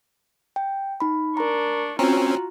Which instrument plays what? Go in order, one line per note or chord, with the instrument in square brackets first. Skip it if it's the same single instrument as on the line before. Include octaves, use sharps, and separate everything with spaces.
[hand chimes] G5
D#4 B5
[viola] D4 C#6 [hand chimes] A#4 A#5
[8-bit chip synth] C4 C#4 [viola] F4 F#4 [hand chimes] A#5